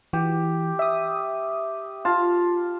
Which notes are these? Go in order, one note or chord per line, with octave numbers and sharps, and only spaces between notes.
E3 G4
E5 D#6
F4 A5